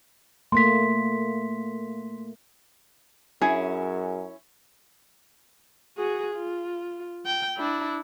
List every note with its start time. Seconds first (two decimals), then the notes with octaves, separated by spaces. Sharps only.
0.52 A3 A#3 C6 B6
3.41 F#2 C#4 E4 G#4
5.98 F#4 G#4
6.35 F4
7.26 G5
7.57 D4 E4